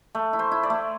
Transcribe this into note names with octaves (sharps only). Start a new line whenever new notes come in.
A3
E4
C5
E4
D5
A3